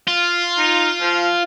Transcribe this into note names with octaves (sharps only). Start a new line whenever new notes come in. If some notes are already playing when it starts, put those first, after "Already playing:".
F4
D#4
F3